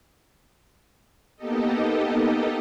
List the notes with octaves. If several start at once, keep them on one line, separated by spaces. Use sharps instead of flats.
A#3 B3 D#4 G4 A4 D#5